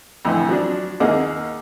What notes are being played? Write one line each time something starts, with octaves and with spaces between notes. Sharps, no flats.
F2 A2 D3 E3
F3 F#3 D4
D#2 A#3 D#4 G#4 F#5 D6